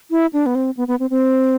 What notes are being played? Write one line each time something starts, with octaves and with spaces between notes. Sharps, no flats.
E4
D4
B3
C4
B3
B3
C4
C4